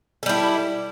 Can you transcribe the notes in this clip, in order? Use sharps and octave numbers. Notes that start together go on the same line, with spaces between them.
G3 E4 A4